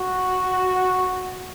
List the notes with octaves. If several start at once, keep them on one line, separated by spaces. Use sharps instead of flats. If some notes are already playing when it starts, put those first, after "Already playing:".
Already playing: F#4